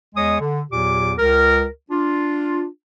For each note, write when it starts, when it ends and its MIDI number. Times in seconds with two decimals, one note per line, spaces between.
0.15 0.36 40
0.15 0.36 56
0.15 0.36 73
0.15 0.36 75
0.15 0.36 87
0.40 0.62 50
0.71 1.13 40
0.71 1.13 46
0.71 1.13 54
0.71 1.13 67
0.71 1.13 86
1.19 1.65 37
1.19 1.65 70
1.91 2.66 62
1.91 2.66 65